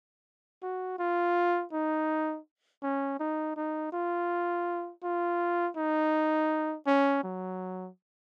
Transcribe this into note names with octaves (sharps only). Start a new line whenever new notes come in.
F#4
F4
D#4
C#4
D#4
D#4
F4
F4
D#4
C#4
F#3